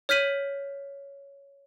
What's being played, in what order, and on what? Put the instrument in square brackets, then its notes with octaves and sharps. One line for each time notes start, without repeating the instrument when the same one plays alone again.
[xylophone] C#5 F6 G6 B6 D#7 F#7